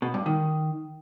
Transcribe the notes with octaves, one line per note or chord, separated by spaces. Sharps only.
B2
G2
D#3